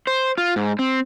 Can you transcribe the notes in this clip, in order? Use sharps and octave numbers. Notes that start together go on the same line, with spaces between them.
C5
F4
G#2
C4